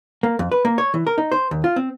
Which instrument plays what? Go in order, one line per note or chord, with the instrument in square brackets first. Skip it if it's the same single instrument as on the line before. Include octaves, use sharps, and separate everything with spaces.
[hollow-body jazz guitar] A#3
F2
B4
A#3
C#5
E3
A#4
D#4
C5
D#2
F4
C4